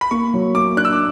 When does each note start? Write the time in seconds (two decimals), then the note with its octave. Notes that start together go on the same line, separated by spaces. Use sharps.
0.01 B5
0.11 A#3 C#6
0.34 F#3
0.55 A#3 D6
0.77 D4 F#6
0.85 E6
0.93 D6